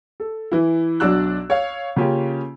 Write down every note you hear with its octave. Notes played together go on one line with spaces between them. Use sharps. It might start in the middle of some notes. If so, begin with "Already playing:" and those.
A4
E3 E4
B1 F#3 D4 D5 E6 F#6
C#5 F5
C#3 A#3 C#4 F4 G4